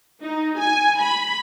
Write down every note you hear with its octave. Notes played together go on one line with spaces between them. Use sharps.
D#4
G#5
B5